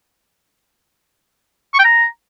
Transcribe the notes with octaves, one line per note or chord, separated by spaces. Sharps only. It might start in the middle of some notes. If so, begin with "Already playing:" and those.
C#6
G5
A#5